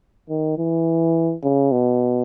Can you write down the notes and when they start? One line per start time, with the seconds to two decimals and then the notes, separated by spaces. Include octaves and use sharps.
0.29 D#3
0.58 E3
1.44 C#3
1.72 B2